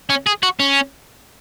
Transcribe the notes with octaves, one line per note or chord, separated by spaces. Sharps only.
C#4
G#4
F#4
C#4